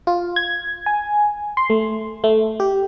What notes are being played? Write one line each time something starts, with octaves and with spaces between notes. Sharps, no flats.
F4
G#6
G#5
C6
A3
A3
G4